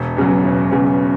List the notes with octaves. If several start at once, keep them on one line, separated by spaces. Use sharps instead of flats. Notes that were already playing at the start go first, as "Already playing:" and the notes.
Already playing: E1
E2 C#3 F#3
E1
E2 C#3 F#3